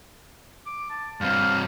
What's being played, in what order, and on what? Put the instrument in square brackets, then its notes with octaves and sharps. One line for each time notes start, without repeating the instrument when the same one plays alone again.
[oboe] D6
A5
[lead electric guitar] G2 C4 [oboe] F5